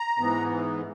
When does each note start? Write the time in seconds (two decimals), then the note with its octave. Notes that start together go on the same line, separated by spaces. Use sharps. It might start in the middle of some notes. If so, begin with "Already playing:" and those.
Already playing: A#5
0.19 G#2 E3 B3